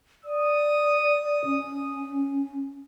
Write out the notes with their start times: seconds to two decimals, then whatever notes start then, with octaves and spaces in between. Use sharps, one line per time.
0.25 D5 D#6
1.45 C#4